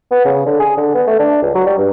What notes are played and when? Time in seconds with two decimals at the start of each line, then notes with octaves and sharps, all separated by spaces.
0.11 B3
0.25 C#3
0.46 D3
0.60 G#4
0.77 D3
0.95 B3
1.07 A3
1.19 D4
1.42 C#2
1.55 F#3
1.66 G3
1.78 G2